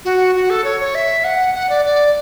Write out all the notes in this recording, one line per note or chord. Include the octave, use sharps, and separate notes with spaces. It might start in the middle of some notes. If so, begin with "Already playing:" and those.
F#4
F#4
A4
C#5
C#5
E5
F#5
F#5
D5
D5